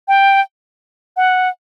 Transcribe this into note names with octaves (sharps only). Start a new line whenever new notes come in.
G5
F#5